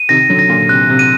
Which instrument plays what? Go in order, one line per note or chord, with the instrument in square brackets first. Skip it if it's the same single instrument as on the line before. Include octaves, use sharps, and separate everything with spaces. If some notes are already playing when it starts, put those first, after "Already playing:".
Already playing: [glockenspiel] D#7
[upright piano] C3 D#3 [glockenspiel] A#6
[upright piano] D3 F#3
[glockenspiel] A#6
[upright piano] A#2 D3
[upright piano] C3 [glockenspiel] F#6
[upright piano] C3
[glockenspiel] D#7